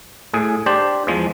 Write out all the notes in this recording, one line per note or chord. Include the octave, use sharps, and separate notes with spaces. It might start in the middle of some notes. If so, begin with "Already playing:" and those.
A2 G#4
D4 G4 C5 D5
E2 F3 G#3